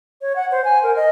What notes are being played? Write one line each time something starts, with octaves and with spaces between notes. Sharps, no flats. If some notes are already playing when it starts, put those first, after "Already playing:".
C#5
F#5
C5
G#5
A#4
D#5